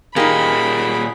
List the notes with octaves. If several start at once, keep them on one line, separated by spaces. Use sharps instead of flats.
A#2 A#3 D#4 G4 G#4 B5